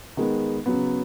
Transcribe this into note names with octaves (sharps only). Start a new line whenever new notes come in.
D#3 G#3 B3
C#3 F#3 B3